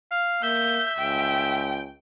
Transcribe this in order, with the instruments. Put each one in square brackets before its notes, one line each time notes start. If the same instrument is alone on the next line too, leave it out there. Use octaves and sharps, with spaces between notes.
[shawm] F5
[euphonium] A#3 [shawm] E5 [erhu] G6
[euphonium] C#2 [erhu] G5